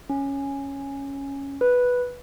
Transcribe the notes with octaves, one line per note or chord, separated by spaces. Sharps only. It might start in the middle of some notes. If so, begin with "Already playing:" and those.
C#4
B4